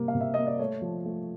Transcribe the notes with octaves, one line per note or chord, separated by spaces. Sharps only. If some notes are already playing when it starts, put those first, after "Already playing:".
Already playing: C3 G3 A#3
F5
C3
E5
A#3 D#5
D5
A3 C#5
F3
A3